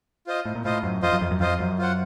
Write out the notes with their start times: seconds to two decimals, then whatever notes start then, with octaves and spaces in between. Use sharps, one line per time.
0.27 F4 C5 D#5
0.45 A2
0.55 A#2
0.65 A2 F4 C5 D#5
0.83 F#2
1.02 F2 F4 C5 D#5
1.13 F#2
1.21 F2
1.31 F#2
1.40 F2 F4 C5 D#5
1.60 F#2
1.79 F4 C5 F#5